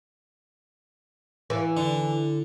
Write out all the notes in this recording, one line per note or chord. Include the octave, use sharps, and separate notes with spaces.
E3
D3